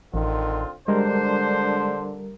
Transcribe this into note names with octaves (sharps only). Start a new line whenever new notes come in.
A1 D3 D#3 C4 F4
D3 G3 G#3 D4 A#4 C5